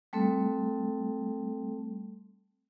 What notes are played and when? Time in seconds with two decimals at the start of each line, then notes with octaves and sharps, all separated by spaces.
0.13 G3 A3 C4 A4